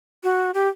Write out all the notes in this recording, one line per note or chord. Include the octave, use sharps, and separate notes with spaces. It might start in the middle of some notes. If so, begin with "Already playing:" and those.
F#4
G4